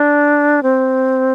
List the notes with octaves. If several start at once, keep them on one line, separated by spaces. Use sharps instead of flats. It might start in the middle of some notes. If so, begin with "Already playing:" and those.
Already playing: D4
C4